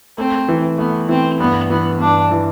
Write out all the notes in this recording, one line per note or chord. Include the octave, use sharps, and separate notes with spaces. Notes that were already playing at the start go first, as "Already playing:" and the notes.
A3 C4
E3
A3 B3
E3 C4
G2 B3
E3 B3
G2 D4
E3